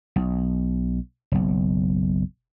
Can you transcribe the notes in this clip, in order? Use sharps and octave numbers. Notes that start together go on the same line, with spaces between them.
B1
F#1 B1